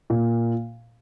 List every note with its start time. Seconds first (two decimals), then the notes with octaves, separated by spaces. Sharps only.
0.10 A#2